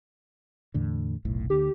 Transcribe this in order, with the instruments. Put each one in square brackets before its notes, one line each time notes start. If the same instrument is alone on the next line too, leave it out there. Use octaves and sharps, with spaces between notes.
[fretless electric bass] E2 A2 D3
F1 B1 A2
[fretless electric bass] D2 D3 [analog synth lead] G4